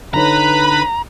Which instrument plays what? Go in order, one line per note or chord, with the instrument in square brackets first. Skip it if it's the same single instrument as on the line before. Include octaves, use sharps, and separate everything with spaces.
[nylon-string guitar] D3 D#4 C#5 [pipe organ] B4 B5 [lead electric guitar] A#5